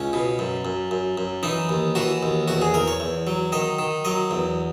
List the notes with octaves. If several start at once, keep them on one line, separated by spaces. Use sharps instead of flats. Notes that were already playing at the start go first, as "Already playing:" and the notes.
Already playing: C#2 C#4
B2
F#2
F#2
F#2
F#2
E3 D#4
D#2
E3 F#4
D#2
E2 F#4
G#4
E2 A#4
C#5
E2
F#3
D#3 D#5
D#3
F#3 D#5
E2